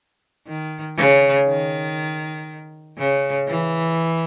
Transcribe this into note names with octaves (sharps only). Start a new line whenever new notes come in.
D#3
C#3
D#3
C#3
E3